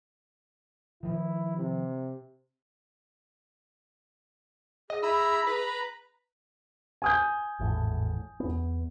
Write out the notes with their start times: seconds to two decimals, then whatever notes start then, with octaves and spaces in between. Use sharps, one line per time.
1.03 D#3 F3 E4
1.56 C3
4.90 G#4 D#5
5.03 E4 A#5 B5 E6
5.47 B4 A#5 B5
7.02 G#5 D#6 G6
7.59 G#1 E2 A2
8.40 E2 B3